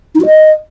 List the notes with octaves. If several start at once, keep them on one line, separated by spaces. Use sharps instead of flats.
D#4
F#4
D#5